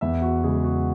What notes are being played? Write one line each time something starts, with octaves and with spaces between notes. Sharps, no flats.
E2 E5
F#4
C#3 G#3 G#4
F#4